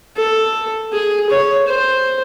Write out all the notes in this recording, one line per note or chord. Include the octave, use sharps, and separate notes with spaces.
A4
G#4
C#5
C5